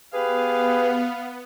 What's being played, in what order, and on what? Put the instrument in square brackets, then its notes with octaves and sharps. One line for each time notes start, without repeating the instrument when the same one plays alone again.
[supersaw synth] B3 [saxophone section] G4 G#4 B4 [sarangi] F5